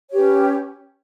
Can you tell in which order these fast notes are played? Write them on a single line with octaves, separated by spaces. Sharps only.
C#5 G4 B4 C#4